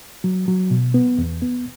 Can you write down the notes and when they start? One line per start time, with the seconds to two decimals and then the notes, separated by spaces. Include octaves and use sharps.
0.24 F#3
0.48 F#3
0.71 B2
0.94 B3
1.18 E2
1.42 B3